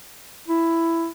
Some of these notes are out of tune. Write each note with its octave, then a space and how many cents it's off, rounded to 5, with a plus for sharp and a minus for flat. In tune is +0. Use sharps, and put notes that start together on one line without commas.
E4 +10